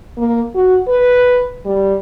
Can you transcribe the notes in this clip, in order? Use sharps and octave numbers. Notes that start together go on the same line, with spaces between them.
A#3
F#4
B4
G3